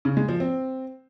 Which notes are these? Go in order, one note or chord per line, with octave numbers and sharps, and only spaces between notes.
C#3
G#3
F3
C4